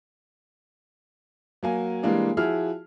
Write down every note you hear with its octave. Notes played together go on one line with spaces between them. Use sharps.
F#3 A#3 G#5
E3 G3 G#3 A#3 D4
F3 E4 F#4 G#4 F6